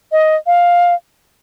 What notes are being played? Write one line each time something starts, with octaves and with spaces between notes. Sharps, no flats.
D#5
F5